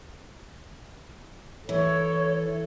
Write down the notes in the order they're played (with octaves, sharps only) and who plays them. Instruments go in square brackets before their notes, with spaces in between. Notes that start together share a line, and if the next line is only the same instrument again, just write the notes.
[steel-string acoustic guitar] E3 [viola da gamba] A4 [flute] C#5